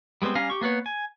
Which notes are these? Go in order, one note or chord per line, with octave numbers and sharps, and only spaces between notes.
G3 G#3 B3 C4 C5
G3 C#4 F5 G#5 A#5
G4 C#6
A#3 B3 B4 C#5
G#5